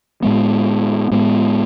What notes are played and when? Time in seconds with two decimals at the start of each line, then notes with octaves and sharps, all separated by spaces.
0.23 A2 G#3 B3
1.11 A2 G#3 B3